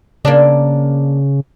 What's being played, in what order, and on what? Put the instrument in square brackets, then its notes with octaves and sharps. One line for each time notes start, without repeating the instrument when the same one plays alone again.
[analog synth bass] C#3 [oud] A#3 D4